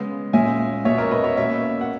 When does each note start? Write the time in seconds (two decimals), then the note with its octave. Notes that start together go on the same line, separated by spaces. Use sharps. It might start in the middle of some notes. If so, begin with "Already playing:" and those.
Already playing: C#3 G#3 B3
0.33 A#2 G#3 C#4 E5 G#5
0.85 B2 G#3 C#4 C#5 E5
0.98 A#4 C#5
1.11 B4 D#5
1.24 C#5 E5
1.37 B2 A#3 C#4 C#5 E5
1.81 F#5